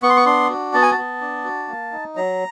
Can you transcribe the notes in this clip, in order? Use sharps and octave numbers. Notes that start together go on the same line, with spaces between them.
B3 C#6
C6
C#6
D4 C6
F#4
B3 A5
G#5
A5
B3
D4
F#4
A#3
D#4
F#3 A#5